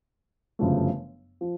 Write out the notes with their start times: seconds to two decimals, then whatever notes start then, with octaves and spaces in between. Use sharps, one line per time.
0.59 G1 F#2 C#3 F3 A3
1.41 F3